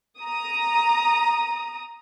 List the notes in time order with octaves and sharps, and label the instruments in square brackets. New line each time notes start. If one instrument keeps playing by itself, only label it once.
[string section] A#5 D#6